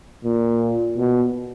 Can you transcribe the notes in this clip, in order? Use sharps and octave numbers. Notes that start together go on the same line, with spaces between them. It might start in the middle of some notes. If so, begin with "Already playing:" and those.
A#2
B2